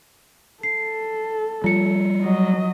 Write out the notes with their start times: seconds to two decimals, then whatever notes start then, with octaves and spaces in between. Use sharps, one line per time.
0.63 A4 C7
1.64 F3 G3 F4 C#7
2.22 F#3 D#5